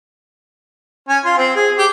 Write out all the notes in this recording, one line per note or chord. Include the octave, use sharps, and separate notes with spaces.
C#4
F4
C4
G#4
G4